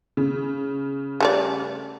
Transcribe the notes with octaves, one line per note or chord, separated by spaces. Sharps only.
C#3
G3 A3 D5